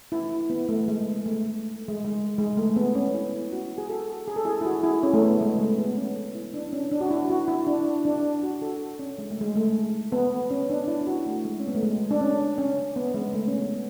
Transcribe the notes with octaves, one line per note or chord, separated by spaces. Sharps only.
E4
B3
A3
G#3
A3
G#3
G#3
G#3
A3
B3
C#4
E4
F#4
G#4
F#4 A4
G#4
A4
E4 G#4
E4
F#4
E4 G#4
C#4
A3
B3
G#3
A3
B3
C#4
E4
D4
C#4
D4
F#4
E4
F#4
E4
D4
D4
F#4
F#4 A4
C#4
G#3
A3
G#3
A3
B3
C#4
D4
E4
E4
F#4
A3
G#3
C#4
B3
A3
G#3
D4
C#4
C#4
B3
G#3
A3
C#4
B3
B3